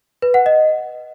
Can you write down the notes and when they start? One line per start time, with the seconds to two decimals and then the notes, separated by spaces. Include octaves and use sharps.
0.22 B4
0.34 F#5
0.46 D#5